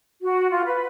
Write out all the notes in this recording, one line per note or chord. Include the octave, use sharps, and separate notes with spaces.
F#4
F4
B4